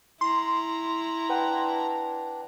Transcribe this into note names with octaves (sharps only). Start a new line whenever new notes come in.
E4 A#5 C6
D4 B4 F#5 G5